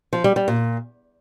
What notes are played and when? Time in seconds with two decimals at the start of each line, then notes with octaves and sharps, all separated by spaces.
0.13 F3
0.24 G3
0.36 G3
0.48 A#2